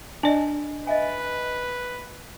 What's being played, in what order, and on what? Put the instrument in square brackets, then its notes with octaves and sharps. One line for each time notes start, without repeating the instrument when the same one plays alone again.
[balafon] D4 D5 [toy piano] D#5 G#5
[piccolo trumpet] B4 [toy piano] D#5 E5 G#5